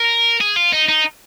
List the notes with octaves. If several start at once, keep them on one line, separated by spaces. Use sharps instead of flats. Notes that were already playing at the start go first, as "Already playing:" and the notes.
Already playing: A#4
G#4
F4
D#4
D#4